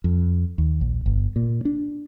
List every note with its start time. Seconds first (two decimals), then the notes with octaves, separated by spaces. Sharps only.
0.04 F2
0.58 D#2
0.81 A#1
1.06 G1
1.36 A#2
1.65 D4